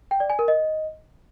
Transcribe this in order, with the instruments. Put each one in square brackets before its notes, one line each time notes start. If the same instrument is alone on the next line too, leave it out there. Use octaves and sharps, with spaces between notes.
[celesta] G5
D5
G#5
A#4
D#5